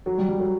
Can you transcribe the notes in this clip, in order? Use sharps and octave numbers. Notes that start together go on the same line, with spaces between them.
F#3
G3
G3
F#3